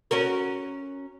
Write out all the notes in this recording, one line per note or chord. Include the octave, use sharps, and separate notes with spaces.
C#4 F#4 A#4